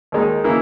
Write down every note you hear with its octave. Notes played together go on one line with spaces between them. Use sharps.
D#2 D#3 G#3 D#4
C#3 E3 A#3 E4